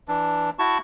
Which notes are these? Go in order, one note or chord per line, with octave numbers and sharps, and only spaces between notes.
E3 D4
E4 F#4 A5 C#6